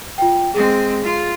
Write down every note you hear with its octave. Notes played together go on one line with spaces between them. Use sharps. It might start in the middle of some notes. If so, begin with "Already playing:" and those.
F4 G5
G#3 C4 G#4
F4